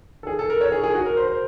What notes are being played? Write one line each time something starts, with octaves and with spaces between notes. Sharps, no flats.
A4
G#4
A4
A#4
C#5
G#4
G#4
F#4
A#4
C5
C5